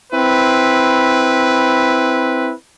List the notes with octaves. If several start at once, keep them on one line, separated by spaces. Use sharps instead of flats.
C4 E4 B4